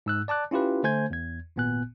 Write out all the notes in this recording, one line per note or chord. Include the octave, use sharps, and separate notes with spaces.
G#2 E6 F#6
D5 A5 D6 F#6
C#4 E4 F4 G4 B4
D3 A3 C5 G#5 G6 G#6
E2 G#6
G#1 A#2 B3 G#5 F#6